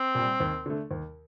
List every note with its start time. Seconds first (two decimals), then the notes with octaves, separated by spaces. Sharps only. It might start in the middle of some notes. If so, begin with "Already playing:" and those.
Already playing: C4
0.15 A#2 G3
0.40 D#2
0.66 D3 A3
0.91 D#2